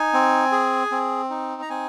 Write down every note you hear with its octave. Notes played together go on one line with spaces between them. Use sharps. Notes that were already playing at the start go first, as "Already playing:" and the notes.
Already playing: D#4 G#5
C4
G#4
C4
D#4
A#5
C4 G#5